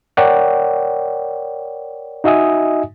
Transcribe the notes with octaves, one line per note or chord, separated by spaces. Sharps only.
A#4 C#5 D5 F#5 G5
D#4 F#4 D#5 E5 G#5 D#6